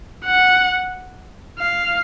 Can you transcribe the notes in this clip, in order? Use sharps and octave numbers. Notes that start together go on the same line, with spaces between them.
F#5
F5